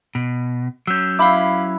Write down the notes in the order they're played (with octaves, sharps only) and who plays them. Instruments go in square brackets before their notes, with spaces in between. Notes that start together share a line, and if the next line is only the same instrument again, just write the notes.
[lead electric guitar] B2
[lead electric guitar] F#3 C#4 [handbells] E6 G6
[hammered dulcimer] E4 [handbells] F5 B5 D6